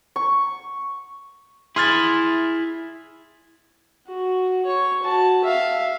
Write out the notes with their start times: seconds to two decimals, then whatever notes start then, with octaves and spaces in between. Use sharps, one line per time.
0.16 C#6
1.76 E4 G#4 C6 F6 A6
4.07 F#4
4.65 C#5 C#6
5.03 F#4 A5
5.44 E5 F5